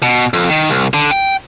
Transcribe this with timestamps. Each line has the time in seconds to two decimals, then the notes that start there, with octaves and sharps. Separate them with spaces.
0.03 B2
0.34 F2
0.49 D#3
0.70 C2
0.94 D3
1.11 G5